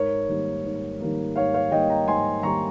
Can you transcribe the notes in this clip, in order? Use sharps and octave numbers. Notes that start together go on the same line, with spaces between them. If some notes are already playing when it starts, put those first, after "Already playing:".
Already playing: G#2 A#4 C#5
D#3 G3 A#3
G#2
D#3 G3 A#3
G#2 C#5 F5
C#5 F5
D#3 G3 A#3 D#5 G5
G5 A#5
G#2 G#5 C6
D#3 G3 A#3 A#5 C#6